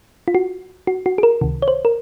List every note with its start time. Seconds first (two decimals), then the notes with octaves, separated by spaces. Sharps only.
0.28 F4
0.35 F#4
0.87 F#4
1.06 F#4
1.18 G#4
1.23 A#4
1.41 C#2 C3 D#3
1.62 C#5
1.68 C5
1.85 A#4